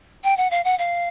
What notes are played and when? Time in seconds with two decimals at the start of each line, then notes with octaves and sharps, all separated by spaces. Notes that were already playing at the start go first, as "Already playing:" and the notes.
0.24 G5
0.37 F#5
0.51 F5
0.65 F#5
0.79 F5